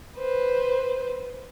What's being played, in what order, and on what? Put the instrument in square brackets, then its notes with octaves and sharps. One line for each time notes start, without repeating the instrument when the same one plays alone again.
[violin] B4 C5